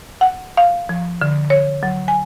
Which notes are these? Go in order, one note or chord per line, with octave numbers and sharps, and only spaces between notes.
F#5
F5
F3
D3
C#5
F#3
G#5